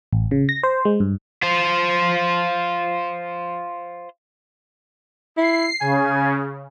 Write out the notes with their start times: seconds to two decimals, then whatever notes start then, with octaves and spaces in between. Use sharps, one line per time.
0.13 A1
0.31 C#3
0.49 A#6
0.63 C5
0.85 G#3
1.00 G2
1.43 F4 C5
5.37 E4 C7
5.81 C#3 G#5